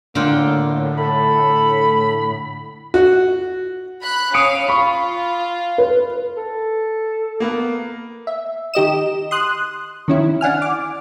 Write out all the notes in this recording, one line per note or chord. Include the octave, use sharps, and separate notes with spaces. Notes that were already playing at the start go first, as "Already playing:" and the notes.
A2 D3 A#3 F4 G5
A4 B5
F#4
B5 F#6
C#4 F5 D#6 C#7 D7
F4 B5 C#6
B4
A4
A#3 B3 A#4
E5
D#3 G4 D#5 E7
C6 D#6 F#6
D#3 C#4 E4
D4 F#5 G#5 F6
D6